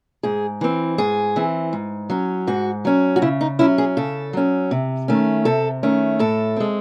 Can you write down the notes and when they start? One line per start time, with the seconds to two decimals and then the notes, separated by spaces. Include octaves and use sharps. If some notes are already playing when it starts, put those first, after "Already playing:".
0.23 G#2 G#4
0.61 E3 C4
0.98 G#2 G#4
1.36 E3 C4
1.73 G#2
2.10 F#3 C#4
2.47 G#2 F#4
2.85 F#3 C#4
3.16 F#4
3.22 C#3 E4
3.41 D#4
3.59 F#3 C#4 E4
3.78 G#4
3.97 C#3 A4
4.33 F#3 C#4
4.71 C3
5.08 D#3 A3 C#4
5.45 C3 A4
5.83 D#3 A3 C#4
6.19 A2 A4
6.56 G#3 C4